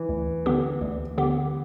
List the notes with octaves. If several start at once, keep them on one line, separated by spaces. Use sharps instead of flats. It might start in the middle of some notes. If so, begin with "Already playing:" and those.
Already playing: E3
D2
D3 B3 G4
D2
D3 B3 G4